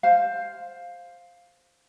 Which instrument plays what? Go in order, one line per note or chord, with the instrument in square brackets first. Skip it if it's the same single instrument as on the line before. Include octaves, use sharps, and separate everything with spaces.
[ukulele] C5 F5